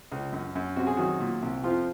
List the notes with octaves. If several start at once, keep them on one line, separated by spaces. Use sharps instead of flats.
C#2
F#2
F#2
C3 F#4
G#4
D#3 F#3 F#4
A#2
C2
F2 F3 F4